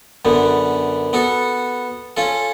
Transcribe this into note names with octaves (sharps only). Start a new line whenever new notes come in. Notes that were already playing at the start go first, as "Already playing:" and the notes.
F#2 D3 B3
B3 F#4 A4
C#4 F4 A4